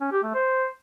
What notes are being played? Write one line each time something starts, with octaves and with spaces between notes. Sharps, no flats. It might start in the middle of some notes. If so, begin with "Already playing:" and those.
C#4
G4
A3
C5